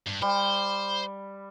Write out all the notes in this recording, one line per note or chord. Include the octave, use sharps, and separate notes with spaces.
G2
G3 C5